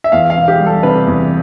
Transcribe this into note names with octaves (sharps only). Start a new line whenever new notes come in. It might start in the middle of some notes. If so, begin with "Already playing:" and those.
E5
E2 F5
F5
E1
G4
G3
A4
C3 B4
E2